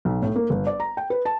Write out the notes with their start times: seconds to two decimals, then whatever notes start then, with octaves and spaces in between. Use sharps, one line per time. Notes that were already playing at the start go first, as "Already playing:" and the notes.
0.05 B1
0.22 A2
0.36 A#3
0.50 G1
0.67 D5
0.80 A#5
0.97 G5
1.10 B4
1.25 A5